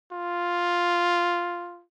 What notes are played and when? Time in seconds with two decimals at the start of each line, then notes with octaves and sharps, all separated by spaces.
0.12 F4